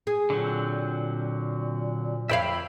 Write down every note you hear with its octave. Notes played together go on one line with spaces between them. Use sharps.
G#4
A#2 D3 F#3 C4
F2 C#5 E5 F5 G5 B5